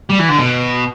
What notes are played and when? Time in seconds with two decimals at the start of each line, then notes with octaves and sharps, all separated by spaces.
0.10 G3
0.19 E3
0.29 D3
0.39 B2